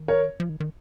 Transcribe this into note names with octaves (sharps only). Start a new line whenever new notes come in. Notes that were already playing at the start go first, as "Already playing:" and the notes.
Already playing: D#3
A#4 C#5
F3
D#3
D#3